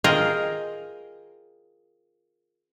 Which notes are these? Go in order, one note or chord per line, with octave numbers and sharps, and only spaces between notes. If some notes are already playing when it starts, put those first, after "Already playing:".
C4 F4 G#4 A#4 D#5